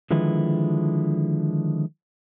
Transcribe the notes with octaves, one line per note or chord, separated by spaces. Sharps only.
D3 D#3 F3 G#3 E4 B4